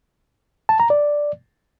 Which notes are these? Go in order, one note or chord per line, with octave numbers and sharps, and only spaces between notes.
A5
A#5
D5